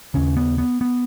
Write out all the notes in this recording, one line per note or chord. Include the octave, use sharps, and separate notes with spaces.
D#2 C#3 C#4
B3
B3
B3